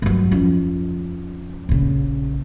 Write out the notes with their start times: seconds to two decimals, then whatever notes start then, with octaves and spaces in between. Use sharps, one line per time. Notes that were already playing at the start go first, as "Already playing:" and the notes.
0.02 G2 F#3
0.31 F2 C#4
1.69 A#1 C#3